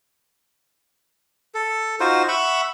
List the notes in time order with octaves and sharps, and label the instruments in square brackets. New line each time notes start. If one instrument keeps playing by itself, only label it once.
[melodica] A4
D#4 F4 F#4 C5
E5 F#5 B5 C#6